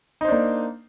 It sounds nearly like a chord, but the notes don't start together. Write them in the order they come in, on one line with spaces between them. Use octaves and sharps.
D#4 C5 D4 A#3